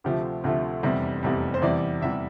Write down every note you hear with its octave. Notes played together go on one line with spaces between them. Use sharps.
D2 C3 F3 A3 G4
D2 C3 F3 A3
F1 E2 C3 G3
F1 E2 C3 G3
C5
E2 C3 E3 G3 D5
E2 C3 E3 G3 E5